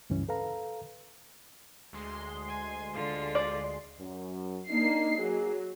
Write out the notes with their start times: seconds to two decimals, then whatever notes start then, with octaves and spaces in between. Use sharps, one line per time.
0.10 C#2 G2 E3 C#4
0.29 A4 B4 F5 A#5
1.93 D2 G#3 C6
2.48 G#5
2.94 D3 F4
3.35 D5
3.99 F#2
4.70 A#3 D4 D#4 C7
5.19 F#3 A#3 G#4